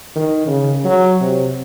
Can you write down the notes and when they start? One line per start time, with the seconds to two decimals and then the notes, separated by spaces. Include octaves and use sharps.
0.15 D#3
0.47 C#3
0.84 F#3
1.21 C3